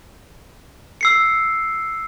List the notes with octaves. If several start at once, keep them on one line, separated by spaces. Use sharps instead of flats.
E6 C7 C#7